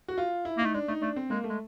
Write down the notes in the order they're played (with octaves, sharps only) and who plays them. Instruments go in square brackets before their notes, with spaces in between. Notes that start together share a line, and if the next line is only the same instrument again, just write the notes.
[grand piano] F#4
F4
E4
[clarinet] A#3 [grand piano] D#4
[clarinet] A3
[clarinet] G#3 [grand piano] D4
[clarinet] A3 [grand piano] D#4
[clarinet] A3 [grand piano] D4
[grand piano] C4
[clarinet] G#3 [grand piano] A#3
[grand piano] A3
[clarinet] G#3